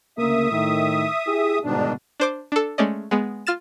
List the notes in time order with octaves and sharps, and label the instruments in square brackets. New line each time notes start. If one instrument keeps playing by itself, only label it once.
[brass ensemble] D2 C#3 A#3 [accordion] E5 D#6
[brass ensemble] A2 D#3
E4 G4 G#4
[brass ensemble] G1 B2 [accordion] G#2 D#3 D4
[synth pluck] D4 C5 D6
D4 A4
G#3 A3 C#4 D5 D#5
G#3 B3
F4 F6 A6 E7